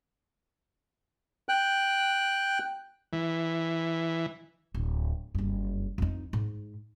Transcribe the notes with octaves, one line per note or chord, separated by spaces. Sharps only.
G5 F#6
E3
D1
F#1 G2
F2 D#4
G#2